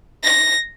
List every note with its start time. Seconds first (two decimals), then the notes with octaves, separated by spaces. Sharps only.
0.23 A#6